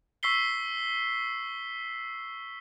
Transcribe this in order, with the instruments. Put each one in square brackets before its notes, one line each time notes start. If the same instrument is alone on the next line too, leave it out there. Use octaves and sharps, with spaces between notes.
[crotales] C#6 E6 B6 C7 G7